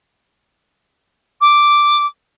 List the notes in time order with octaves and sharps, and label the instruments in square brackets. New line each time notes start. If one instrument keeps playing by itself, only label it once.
[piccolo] D6